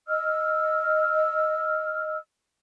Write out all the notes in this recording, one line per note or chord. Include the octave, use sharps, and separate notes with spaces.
D#5 E6 F6